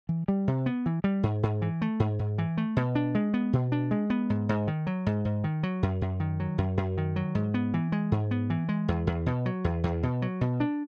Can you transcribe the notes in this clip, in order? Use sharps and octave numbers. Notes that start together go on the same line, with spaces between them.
E3
G3
C3
B3
E3
G3
G#2
G#2
E3
A3
G#2
G#2
E3
A3
B2
D4
G#3
B3
B2
D4
G#3
B3
G#2
G#2
D#3
F#3
G#2
G#2
D#3
F#3
F#2
F#2
D#3
F#3
F#2
F#2
D#3
F#3
G#2
B3
E3
G#3
G#2
B3
E3
G#3
E2
E2
B2
F#3
E2
E2
B2
F#3
B2
D4